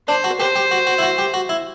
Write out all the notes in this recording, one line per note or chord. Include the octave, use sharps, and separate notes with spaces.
D4 C5
F#4
G4 C5
G4
F#4
F#4
E4
F#4
G4
F#4
E4